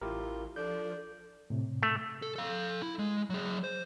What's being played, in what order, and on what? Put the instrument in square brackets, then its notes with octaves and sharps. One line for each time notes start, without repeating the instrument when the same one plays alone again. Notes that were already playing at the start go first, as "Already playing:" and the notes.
[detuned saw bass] A1 [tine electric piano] E4 G4 A#4 [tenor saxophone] F4
[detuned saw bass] F3 [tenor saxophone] D4 [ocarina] A4 [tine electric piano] G6
[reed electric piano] A2 C3
[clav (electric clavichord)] A3
[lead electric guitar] A4
A4 F5
E4
G#3
F#3 G#4
C5